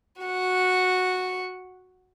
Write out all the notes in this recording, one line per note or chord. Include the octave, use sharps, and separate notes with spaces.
F#4 F#5